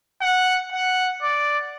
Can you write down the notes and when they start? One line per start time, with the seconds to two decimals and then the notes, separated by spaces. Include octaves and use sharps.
0.22 F#5
0.73 F#5
1.23 D5